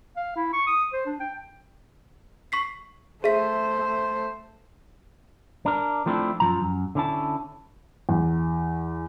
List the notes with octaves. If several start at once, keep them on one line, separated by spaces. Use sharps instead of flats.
F5
E4
C#6
D#6
C5
D4
G5
C#6 B6 C7
A3 G#4 C5 E5 B6
D4 A#4
F3 A3 C4 D4 E4
F#2 F3 A#5
F#2
D3 C#4 E4 A5
E2